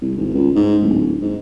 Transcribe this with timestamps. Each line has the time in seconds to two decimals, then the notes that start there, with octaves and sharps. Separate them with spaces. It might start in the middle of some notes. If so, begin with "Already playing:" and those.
0.02 C2
0.17 G#1
0.34 C#2
0.56 G#2
0.82 D1
1.22 G#2